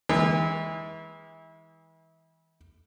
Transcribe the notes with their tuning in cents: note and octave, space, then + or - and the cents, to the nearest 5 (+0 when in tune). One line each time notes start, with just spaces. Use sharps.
E3 -30 G#3 -30